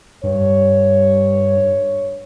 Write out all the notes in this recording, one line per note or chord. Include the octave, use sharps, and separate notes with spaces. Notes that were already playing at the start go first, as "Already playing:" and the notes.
G2 C#5